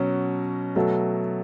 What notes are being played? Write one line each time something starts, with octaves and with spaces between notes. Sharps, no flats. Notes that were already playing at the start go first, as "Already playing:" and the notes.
Already playing: B2 F#3 C#4
B2 F#3 A3